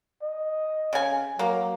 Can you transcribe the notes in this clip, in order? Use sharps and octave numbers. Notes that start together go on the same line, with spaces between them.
D#5
C#3 G#5
F#3 A#3